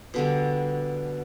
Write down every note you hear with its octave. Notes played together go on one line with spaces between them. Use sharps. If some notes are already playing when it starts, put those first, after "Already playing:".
B2 D3 G3